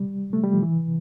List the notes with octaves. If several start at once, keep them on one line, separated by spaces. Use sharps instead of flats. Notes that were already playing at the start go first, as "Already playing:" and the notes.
Already playing: G3
A3
G3
F3
E3